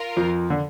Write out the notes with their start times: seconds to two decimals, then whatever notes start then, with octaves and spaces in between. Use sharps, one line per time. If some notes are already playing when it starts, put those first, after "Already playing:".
Already playing: F4 A#4
0.17 F2 F3
0.50 D3